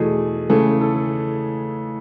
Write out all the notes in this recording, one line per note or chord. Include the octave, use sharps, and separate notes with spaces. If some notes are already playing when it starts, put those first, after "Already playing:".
Already playing: E2 B2 A3 G#4
C#3 E3 A3 G#4
A4